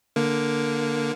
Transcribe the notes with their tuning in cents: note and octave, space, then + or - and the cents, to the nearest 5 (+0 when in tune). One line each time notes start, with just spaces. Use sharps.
D3 +0 A#3 +5